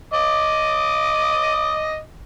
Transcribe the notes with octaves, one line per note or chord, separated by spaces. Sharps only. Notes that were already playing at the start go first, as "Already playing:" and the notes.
D#5 D6 D#6